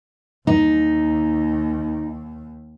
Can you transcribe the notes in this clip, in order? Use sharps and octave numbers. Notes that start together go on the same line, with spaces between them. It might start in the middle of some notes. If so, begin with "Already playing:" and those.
D#2 D#4